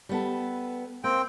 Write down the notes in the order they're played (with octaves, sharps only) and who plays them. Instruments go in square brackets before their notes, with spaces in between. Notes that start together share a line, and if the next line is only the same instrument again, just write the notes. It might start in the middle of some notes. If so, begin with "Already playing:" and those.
[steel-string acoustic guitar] G3 B3 A4
[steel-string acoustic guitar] A#3 [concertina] C4 G5